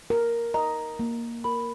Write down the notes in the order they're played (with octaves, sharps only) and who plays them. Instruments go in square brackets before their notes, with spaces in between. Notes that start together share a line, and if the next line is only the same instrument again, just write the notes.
[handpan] A#4
[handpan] D#5 [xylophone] A#5
[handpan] A#3
[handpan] A#4 [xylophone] B5